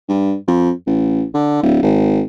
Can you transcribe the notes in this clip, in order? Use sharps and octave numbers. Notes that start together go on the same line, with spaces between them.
G2
F2
A1
D3
D1
G#1